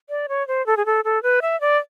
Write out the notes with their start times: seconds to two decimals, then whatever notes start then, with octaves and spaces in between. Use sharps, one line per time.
0.10 D5
0.29 C#5
0.48 C5
0.66 A4
0.77 G#4
0.86 A4
1.05 A4
1.23 B4
1.42 E5
1.61 D5